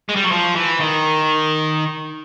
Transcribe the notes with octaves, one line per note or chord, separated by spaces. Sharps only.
G#3
G3
F#3
F3
E3
D#3